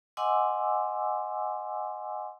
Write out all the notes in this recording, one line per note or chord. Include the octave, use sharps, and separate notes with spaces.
D#5 F#5 G#5 C6 D6 E6